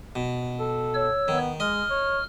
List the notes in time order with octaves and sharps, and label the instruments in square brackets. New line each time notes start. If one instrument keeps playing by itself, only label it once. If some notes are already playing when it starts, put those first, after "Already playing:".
[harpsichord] B2
[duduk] A4
[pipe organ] C#5 E6
[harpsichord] D#3 [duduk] B3
[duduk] G#3 [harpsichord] D#5 [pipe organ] F6
[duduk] C#5